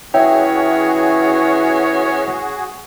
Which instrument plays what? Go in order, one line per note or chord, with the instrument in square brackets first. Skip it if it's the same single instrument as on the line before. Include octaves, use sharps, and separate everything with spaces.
[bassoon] E3 [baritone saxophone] C#4 [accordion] F#4 G#4 [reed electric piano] C#5 E5 G5